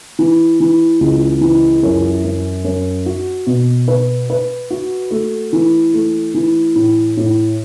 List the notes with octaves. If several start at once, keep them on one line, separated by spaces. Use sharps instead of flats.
E3
E3
C#2
E3
F#2
F#2
F#2
F#4
B2
B4
B4
F#4
A3
E3
A3
E3
A2
A2